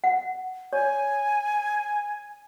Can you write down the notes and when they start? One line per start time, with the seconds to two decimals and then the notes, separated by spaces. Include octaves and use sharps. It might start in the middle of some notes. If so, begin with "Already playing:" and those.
0.04 F#5
0.73 C#5 G#5